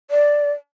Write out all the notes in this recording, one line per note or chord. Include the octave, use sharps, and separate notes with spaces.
D5